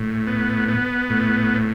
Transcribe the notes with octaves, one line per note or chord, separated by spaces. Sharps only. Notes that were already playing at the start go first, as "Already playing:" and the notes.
Already playing: A2
B3
B3
A2